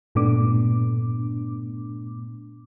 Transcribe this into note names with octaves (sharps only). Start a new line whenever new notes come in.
G2 A#2 A3 B3 D4 D6